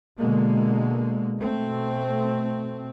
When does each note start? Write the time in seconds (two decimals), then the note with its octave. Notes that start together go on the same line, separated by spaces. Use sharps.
0.19 B2 D3 G#3 A#3
1.39 B2 A3 C4